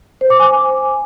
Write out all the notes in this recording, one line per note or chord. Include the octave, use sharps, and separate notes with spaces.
C5
D6
G#5